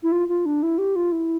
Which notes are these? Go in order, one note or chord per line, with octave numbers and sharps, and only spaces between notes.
E4
F4
F4
D4
E4
G4
F4
E4